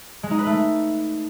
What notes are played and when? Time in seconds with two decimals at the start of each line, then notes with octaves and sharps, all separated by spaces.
0.23 G#3
0.31 D#4
0.39 B4
0.46 A3